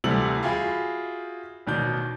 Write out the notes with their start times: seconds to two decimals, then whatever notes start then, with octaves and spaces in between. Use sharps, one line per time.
0.04 D2 C3 E3 G3 A4 F#7
0.43 F4 F#4 G#4 E5 G5 B5
1.67 A1 B2 D#3 D5 G6